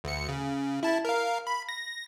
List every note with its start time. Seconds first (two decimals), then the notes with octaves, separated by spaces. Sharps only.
0.04 D2 C#7
0.28 C#3
0.83 E4 A5
1.05 A#4 F5
1.47 B5
1.69 A#6